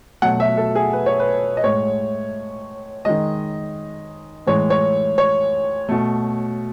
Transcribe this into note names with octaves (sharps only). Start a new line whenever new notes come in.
B2 F#3 A3 F#5
E5
A4
G#4
B4
C#5
B4
D#5
A2 G#3 C#5
D#3 G#3 D#5
A2 E3 G#3 C#5
C#5
C#5
B2 A3